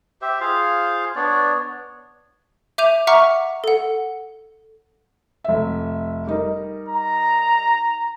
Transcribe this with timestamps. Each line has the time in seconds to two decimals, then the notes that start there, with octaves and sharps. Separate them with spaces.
0.22 G4 C5 E5
0.41 F4 G#4 C5 F5
1.16 B3 D4 C#5 D5
2.78 E5 D6 G6 D#7 F7
3.07 E5 F#5 A#5 C#6 D6 F6
3.64 A4 F#5
5.44 F1 E5
6.27 G3 D#4 A#4
6.88 A#5